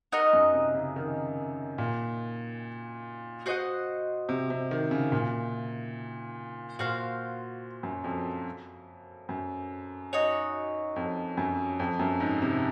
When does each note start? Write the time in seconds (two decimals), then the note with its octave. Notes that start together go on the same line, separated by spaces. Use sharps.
0.12 D#4 A#4 D#5 F#5
0.33 F#2
0.53 C3
0.75 C#3
0.96 D#3
1.78 A#2
3.46 F#4 C5 D#5 F#5
4.29 C3
4.50 C3
4.71 D#3
4.91 C#3
5.12 A#2
6.79 A#2 F#4 C5 F5
7.83 F#2
8.04 F2
9.29 F#2
10.13 D#4 F#4 C#5
10.96 F2
11.37 F#2
11.80 F2
11.99 F#2
12.20 G#2
12.42 C3